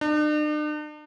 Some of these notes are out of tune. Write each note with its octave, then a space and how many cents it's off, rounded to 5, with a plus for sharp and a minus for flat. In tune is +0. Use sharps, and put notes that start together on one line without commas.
D4 +45